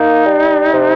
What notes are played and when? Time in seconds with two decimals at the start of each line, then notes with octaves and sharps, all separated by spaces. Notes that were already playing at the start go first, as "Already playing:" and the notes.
Already playing: A#3 D#4
0.26 G3
0.73 C3